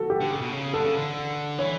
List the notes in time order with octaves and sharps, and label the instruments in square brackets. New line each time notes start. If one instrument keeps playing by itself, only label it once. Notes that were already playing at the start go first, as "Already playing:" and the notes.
Already playing: [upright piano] F#4 A4
G4
[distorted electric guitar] D3
C#3
B2
C#3
[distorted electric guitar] D3 [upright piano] A4
[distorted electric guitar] C#3
D3
[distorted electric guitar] E3 [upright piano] C#5